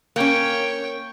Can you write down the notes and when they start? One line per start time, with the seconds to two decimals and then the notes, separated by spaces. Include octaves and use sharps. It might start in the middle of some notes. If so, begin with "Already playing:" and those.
0.16 A#3 C#4 C#5 G5